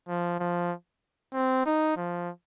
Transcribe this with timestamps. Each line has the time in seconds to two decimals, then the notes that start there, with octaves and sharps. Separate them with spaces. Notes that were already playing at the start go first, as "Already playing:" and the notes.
0.08 F3
0.40 F3
1.34 C4
1.66 D#4
1.97 F3